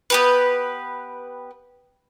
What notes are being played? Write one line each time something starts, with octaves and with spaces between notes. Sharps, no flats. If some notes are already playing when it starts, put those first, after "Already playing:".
B3 G4 B4